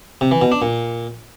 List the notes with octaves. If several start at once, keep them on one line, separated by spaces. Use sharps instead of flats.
C3
E3
B2
D4
A#2